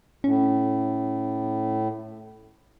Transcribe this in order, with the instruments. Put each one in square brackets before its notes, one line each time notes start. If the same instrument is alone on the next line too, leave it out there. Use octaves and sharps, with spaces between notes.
[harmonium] A2 [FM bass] C#4